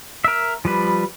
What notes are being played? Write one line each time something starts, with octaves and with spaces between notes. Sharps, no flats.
A#4 E5
F3 G3 B4